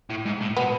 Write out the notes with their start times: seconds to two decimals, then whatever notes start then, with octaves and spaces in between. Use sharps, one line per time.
0.10 A2
0.25 G#2
0.41 A2
0.57 B2 B3